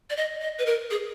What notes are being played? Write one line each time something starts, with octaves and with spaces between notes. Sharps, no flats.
D5
D#5
D#5
B4
A#4
G#4